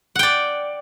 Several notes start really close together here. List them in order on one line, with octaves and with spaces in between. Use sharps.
F#5 G5 D5